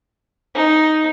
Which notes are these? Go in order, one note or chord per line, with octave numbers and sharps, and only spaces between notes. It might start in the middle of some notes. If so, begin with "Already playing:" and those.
D#4